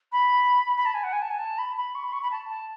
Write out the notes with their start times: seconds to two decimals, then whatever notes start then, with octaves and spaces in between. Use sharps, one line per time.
0.12 B5
0.76 B5
0.85 A5
0.94 G#5
1.03 F#5
1.12 G#5
1.21 A5
1.30 G#5
1.38 A5
1.58 B5
1.76 B5
1.94 C#6
2.03 B5
2.12 C#6
2.22 B5
2.31 A5
2.49 A5